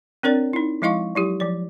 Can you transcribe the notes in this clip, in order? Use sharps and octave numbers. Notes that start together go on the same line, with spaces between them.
C4 D4 A#4 C#5 D5
D#4 E4
F3 G#3 E4 D#5 F5 C#6
F#3 E4 G4
F3 D5